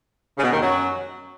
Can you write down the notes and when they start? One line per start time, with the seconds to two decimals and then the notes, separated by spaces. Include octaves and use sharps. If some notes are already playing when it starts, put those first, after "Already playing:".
0.38 C#3
0.42 B2
0.51 D#2 D#3
0.62 F#2 F#3